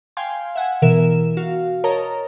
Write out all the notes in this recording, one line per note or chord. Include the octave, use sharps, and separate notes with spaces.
F5 G5 G#5 C6
E5 F#5 G#5
B2 E3 A#4 E5 E7
F#4 F5
A#4 C#5 D#5 A5 A#5